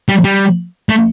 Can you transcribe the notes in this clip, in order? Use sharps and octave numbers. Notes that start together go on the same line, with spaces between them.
G3
G3
A3